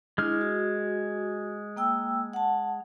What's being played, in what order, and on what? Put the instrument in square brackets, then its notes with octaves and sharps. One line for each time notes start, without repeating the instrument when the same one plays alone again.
[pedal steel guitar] G#3 F6 [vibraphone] D4 E4
[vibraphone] F#4
A#3 G5 E6
F#5 A5